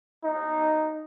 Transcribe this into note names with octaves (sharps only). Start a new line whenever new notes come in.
D#4